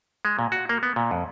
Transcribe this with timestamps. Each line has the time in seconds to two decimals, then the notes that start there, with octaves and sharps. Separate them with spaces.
0.25 G#3
0.39 A#2
0.52 F#4
0.69 A#3
0.83 B3
0.96 A#2
1.11 F2